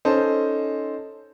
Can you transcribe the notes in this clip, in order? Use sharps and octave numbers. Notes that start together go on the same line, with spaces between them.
C#4 D#4 A4 C5